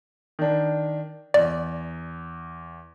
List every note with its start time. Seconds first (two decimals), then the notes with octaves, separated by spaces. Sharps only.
0.39 D#3 D4
1.34 E2 D5